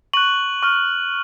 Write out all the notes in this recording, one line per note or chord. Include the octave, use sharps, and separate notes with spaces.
C#6 F#6 F#7
C#6 F6